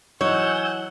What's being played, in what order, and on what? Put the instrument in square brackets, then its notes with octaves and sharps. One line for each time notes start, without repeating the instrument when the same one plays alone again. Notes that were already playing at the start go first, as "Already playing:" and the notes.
[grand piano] E3 F#3 D#4 [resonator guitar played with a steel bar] C#5 [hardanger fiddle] F#5 [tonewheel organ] G#5 E6 G6